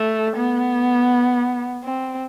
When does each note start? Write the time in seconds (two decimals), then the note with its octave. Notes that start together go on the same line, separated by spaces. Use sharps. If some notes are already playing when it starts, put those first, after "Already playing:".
Already playing: A3
0.36 B3
1.84 C4